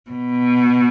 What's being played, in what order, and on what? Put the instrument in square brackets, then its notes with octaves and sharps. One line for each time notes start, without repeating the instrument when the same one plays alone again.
[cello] B2